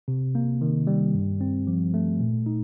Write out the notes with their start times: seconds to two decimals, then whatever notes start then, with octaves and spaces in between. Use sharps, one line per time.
0.08 C3
0.35 A#3
0.61 D#3
0.87 G3
1.14 G2
1.41 C4
1.67 F3
1.94 A3
2.20 A#2
2.46 D#4